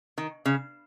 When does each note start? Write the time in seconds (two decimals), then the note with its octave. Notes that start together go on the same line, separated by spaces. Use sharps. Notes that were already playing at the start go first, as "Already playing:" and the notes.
0.18 D#3
0.45 C#3